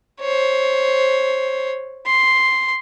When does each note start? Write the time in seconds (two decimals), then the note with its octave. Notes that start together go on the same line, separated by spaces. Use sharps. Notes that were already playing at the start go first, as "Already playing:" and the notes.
0.21 C5 C#5
2.06 C6